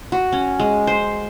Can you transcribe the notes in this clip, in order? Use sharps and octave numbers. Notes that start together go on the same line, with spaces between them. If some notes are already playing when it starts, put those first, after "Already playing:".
F#4
C#4
G#3
C5